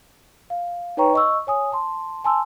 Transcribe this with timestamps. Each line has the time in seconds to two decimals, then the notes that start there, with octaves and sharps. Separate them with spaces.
0.50 F5
0.97 D#4 B4 C#5 G5 A#5 C#6
1.14 D#5 C#6 E6
1.47 C#5 G#5 D#6
1.72 A5 C6
2.24 G#5 A5 C6 E6